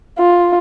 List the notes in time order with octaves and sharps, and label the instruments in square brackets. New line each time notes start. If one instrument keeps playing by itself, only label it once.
[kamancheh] F4